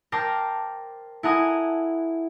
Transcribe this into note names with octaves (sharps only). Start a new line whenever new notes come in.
A#4 C5 G5 A5 A#5 D6
E4 A4 F#5 G#5 A#5 D#6